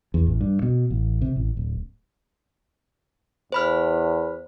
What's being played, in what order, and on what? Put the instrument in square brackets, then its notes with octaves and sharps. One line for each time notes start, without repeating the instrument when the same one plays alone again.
[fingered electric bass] E2
A1
G2
B2
A1
C3
A1
D1
[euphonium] E2 [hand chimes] C5 B5 F6